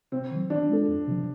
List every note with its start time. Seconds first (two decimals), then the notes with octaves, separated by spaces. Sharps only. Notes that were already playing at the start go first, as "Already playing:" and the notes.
0.12 C3 C4
0.31 D#3 F#3
0.50 E3 D4
0.69 G#3 C4 F4 A4
0.88 F2
1.07 C3 F3